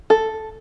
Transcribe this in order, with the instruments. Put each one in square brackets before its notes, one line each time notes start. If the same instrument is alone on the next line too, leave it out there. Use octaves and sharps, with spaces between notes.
[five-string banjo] A4